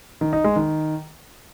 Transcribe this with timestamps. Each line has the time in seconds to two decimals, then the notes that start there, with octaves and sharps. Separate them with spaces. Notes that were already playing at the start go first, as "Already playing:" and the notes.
0.21 D#3
0.33 D#4
0.44 G#3
0.56 D#3